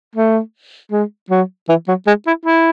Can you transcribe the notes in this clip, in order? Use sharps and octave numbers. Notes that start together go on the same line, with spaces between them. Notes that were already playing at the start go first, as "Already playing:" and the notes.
A3
G#3
F#3
E3
F#3
G#3
E4
E4